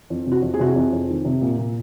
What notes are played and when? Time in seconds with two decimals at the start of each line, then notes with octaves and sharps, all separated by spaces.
0.10 F2
0.26 C3
0.32 F#4
0.42 F2
0.54 G#4
0.59 C3 F#4
0.68 G#4
0.76 F2
0.93 F2
1.10 D#3
1.25 C3
1.41 A#2
1.58 A#2